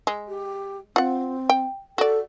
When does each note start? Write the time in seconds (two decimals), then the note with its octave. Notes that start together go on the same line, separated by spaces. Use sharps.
0.07 G#3
0.28 G4
0.96 C4 F4 F#5
1.49 G5
1.98 F#4 A4 D5